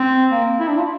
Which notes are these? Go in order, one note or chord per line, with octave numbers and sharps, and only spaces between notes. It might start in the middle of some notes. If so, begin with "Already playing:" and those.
Already playing: C4
A#3
E4
D4
F4